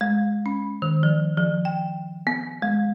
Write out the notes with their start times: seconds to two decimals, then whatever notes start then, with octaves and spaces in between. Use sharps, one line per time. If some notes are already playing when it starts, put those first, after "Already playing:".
0.01 G#3
0.46 C#4
0.82 D#3
1.03 F3
1.38 F3
1.65 G5
2.27 B3
2.62 G#3